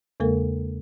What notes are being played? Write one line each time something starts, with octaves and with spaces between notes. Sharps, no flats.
E2 C#3 G#3 A#3 A4 A#4